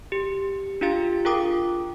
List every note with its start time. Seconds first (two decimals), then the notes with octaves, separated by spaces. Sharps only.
0.12 G4
0.81 D4 F4 G4 F5 A6
1.25 F4 G#4 A#4 G5 D6 D#6